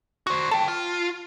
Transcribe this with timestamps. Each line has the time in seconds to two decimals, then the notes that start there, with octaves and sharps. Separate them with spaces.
0.27 F#4 C5 C#6
0.51 A4 G5 A5
0.68 F4